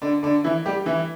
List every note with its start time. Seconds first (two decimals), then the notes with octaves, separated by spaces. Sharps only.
0.02 D3 D4
0.23 D3 D4
0.44 E3 E4
0.66 G3 G4
0.86 E3 E4